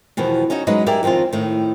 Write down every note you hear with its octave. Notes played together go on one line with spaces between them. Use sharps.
E2 B2 D#3 F3
C#4 D#4 F#4 D#5
F#3 G#3 C#4 D#4 B4 D#5
E4 G4 G#4 A#4 D5
F2 D#3 C4 C#4 F4
A2 D#3